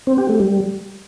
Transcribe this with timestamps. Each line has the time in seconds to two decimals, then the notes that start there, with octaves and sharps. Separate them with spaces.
0.07 C4
0.18 G4
0.29 A3
0.40 G3